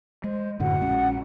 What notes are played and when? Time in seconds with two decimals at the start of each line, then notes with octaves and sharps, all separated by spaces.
0.24 G#3 C5
0.60 F#2 A2 D3 F#4 F#5
0.81 A#1 G#3 C#4